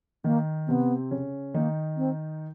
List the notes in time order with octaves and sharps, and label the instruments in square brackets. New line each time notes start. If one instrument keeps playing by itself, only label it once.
[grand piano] D#3 D#4 [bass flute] A#3
[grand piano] C3 C4 [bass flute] B3
[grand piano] C#3 C#4
[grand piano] D#3 D#4 [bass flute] A#3
[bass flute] C4